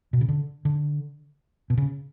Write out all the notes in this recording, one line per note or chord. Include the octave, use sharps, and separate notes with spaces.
B2
C#3
D3
D3
B2
C#3